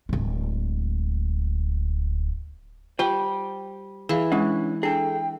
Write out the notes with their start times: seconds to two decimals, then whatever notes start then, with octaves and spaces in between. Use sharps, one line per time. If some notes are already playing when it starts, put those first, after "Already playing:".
0.09 D1 G#3
2.99 G3 F4 C5 G5
4.09 E3 G#4 F5
4.32 G#3 C#4 D4 F#5
4.83 D4 G#4 A4 G5